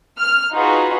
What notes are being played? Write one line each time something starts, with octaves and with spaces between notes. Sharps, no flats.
F6
D#4 F4 F#4 G#4 B4